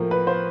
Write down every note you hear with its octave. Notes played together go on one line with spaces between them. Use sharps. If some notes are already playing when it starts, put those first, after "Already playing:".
Already playing: A2 F3 A#3 A#4
B4
C5